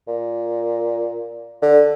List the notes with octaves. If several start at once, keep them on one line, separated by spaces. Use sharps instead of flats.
A#2
D3